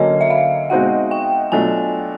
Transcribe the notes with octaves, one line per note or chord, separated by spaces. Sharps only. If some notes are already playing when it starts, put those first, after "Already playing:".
Already playing: D3 F#3 A#3 C#4 D#5
E5
F5
B2 G#3 C4 D#4 F#4 F#5
G5
B2 F#3 A3 D4 F4 G#5